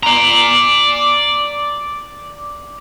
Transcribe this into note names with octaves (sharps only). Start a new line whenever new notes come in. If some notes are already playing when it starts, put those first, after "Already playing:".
D5 A#5